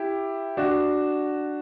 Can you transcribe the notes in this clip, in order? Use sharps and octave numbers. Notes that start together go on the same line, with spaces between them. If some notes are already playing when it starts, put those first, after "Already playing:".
Already playing: E4 G4
D4 F#4